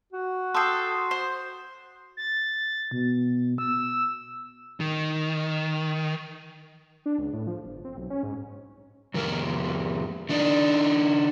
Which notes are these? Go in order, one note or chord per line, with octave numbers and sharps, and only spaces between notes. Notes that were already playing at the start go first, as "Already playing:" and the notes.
F#4
A4 G5 C6 D#6 C7
C5
A6
B2
E6
D#3
D4
C#2
A2
F3
G1
C4
B1
C#4
G#2
F2 D#3 A#4
D#3 D4 D#4